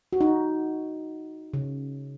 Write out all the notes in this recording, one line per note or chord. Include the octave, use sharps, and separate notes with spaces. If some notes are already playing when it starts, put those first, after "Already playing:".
F#4
D#4
C#3